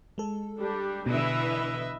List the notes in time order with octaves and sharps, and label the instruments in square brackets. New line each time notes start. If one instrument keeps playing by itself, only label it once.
[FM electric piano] G#3 A4
[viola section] G3 D4 G4
[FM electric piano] B2 [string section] D3 E3 [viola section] B4 D#5 E5